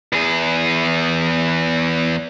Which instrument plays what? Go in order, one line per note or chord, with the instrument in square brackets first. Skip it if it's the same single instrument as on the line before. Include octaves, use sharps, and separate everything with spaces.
[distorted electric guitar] E2 G#4